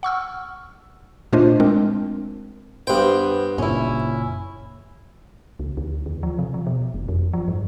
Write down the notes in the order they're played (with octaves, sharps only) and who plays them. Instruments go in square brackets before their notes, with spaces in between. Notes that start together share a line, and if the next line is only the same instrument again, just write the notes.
[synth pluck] F#5 C#6 E6 F6
A#2 A3 D4 F4 C5 D#5
G#3 C4 D4 A#4
[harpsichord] G2 G5 [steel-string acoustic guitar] B3 C5
[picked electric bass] F#1 A#2 [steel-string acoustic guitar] C#4 E4
[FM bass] C#2
D2
D#2
F3
C3
F3
B2
F#1
F2
F3
G2